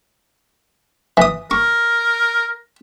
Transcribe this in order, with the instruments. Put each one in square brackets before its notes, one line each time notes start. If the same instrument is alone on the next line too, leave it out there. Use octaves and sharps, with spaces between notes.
[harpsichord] E3 D#6
[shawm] A#4 [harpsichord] C#6